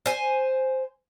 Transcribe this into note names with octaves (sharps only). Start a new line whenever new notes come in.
C5 G#5